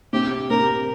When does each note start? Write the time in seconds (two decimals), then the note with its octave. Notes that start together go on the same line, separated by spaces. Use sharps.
0.13 C3 G4
0.50 C3 A#4